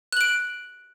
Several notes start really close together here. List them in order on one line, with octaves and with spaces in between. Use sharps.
F#6 F#7 D7